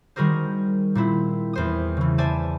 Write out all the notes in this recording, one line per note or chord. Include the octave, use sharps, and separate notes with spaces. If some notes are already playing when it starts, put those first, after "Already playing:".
D#3 G3 F#4 G#4 A#4 C5
A#2 C4 E4
E2 C5 D#6
C#3 E3
C5 D5 E5 G#5 A5